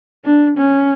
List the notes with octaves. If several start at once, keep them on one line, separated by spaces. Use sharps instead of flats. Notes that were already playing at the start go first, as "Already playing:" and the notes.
D4
C#4